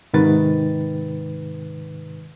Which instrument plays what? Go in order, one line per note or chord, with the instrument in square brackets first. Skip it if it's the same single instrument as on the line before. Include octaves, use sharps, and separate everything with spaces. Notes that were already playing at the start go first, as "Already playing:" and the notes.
[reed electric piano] G#2 C3 D#3 B4 A6